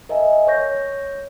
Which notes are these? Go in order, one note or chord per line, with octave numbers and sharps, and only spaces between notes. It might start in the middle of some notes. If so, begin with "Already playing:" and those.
A#4 D#5 E5 G#5
C#5 C#6 G6 A#6